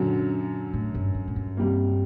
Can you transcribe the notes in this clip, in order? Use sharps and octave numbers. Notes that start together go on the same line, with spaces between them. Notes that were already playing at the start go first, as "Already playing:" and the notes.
Already playing: F#2 A#2 D3 F#3
A2
G2
G2
A2
G2
C3 G3 A#3